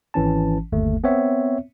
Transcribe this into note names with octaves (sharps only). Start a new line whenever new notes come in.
G#1 E3 C#4 A5
G1 D#2 A3
B3 C4 C#5 E5